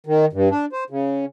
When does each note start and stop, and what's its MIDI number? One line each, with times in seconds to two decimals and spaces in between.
0.07 0.25 51
0.33 0.49 43
0.51 0.65 62
0.73 0.84 72
0.90 1.25 49